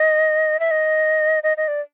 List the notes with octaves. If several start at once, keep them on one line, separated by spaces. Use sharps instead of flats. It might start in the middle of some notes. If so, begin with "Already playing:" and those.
Already playing: D#5
E5
D#5
D#5
D#5
D5